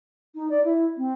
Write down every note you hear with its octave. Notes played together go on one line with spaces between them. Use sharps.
D#4
D5
E4
C4